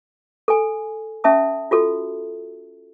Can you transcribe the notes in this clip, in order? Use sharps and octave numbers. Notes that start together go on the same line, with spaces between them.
A4 G#5
C#4 E5 A5 D#6
F4 F#4 A4